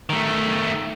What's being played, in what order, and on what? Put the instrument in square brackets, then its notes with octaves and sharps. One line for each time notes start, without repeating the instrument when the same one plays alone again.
[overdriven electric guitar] D#3 A3